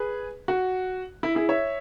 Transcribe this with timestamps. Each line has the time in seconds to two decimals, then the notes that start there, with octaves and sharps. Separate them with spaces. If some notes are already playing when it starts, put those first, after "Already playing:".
Already playing: G#4 B4
0.48 F#4
1.23 E4
1.35 E4 G#4
1.49 C#5 E5